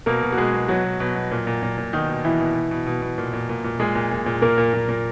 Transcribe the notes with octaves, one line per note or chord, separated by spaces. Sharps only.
B2 A#3 A#4
B2
F#4
B2 G#3 G#4
B2
B2 F#3 F#4
B2
B2
B2
A#2
A#2
A#2
A#2
B2 D#3 D#4
B2
B2 E3 E4
B2
B2
B2
B2
B2
A#2
A#2
A#2
A#2
A#2 G#3 G#4
A#2
A#2
A#2
A#2 A#3 A#4
A#2
A#2
A#2